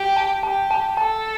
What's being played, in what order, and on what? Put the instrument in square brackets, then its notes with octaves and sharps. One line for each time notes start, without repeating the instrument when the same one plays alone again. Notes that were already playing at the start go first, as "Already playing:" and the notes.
Already playing: [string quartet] G4
[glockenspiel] A5
[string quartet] G4 [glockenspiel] A5
[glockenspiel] A5
[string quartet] A4 [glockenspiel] A5